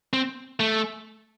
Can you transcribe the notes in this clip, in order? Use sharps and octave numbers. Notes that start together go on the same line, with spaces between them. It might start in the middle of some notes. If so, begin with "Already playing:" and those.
C4
A3